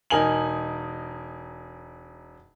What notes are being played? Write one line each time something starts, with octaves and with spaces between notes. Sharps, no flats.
E1 D#4 A#4 G#5 F#7